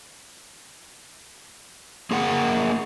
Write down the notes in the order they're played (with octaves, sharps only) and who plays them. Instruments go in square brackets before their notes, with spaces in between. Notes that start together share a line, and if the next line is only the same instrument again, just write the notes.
[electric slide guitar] A#3 G#4 A#4 F#5